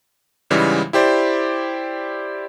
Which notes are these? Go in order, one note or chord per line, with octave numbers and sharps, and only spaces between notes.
G#2 C#3 E3 G3 G#3
E4 G4 C5 D5